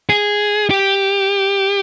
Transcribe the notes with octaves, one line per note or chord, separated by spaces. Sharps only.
G#4
G4